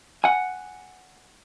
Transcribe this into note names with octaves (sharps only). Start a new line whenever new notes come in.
F#5 G#5